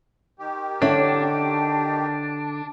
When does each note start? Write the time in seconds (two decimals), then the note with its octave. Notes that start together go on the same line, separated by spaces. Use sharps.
0.39 D#3 G4
0.82 D3 C#4 D4 E4